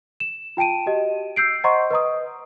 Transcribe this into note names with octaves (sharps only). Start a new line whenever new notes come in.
E7
F4 G5 A5 D7 D#7
F#4 G4 D#5
E6 G6 C7 D7
C5 D#5 F#5 A#5 C6 C#6
B4 D#5 A#5 D#6